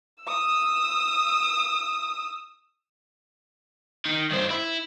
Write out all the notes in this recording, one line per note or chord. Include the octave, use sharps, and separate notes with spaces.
D#6 E6
D#3
G2 C4
E4